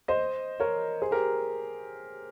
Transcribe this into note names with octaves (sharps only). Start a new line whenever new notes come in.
C5 D#5
A#4 C#5
G#4 C5
G4 A#4